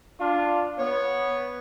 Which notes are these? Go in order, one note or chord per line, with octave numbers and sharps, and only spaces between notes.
D4 F4
B3 C#5